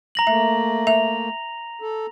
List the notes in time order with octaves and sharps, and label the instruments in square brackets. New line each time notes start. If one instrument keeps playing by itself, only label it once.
[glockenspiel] A#5 A#6 F#7
[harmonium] A3 A#3 [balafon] E5
[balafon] E5 [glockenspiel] F7
[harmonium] A4